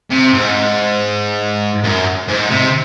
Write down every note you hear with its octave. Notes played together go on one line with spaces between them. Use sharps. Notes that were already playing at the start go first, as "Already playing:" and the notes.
C3
G#2
F#2
G#2
C3